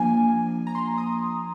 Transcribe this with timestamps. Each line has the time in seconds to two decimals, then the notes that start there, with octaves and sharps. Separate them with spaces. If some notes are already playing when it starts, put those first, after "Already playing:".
Already playing: F3 A#3 D4 G#5
0.67 A#5
0.75 C6
0.98 D#6